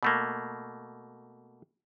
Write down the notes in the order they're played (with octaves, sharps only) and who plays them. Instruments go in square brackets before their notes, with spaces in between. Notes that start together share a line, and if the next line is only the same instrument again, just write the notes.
[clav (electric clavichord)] B2 A3 A#3